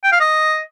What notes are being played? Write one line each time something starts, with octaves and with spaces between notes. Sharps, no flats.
G5
F5
D#5